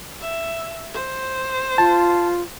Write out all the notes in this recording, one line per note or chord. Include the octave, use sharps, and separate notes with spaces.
E5
C5
F4 A5